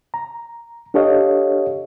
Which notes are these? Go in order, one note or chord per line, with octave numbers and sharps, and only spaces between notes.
A#5
D4 G4 A4 C#5 D#5 F5